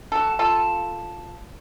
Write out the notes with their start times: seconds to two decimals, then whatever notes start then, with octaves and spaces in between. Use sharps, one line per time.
0.12 F#4 A4
0.39 F4 A4